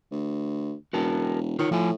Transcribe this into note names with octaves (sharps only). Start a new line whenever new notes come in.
D2
E1 F#4 A#4 A5
D#3 F4 C#5
A2 F3 F4 G#5